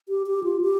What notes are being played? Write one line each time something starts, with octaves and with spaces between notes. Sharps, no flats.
G4
G4
F4
G4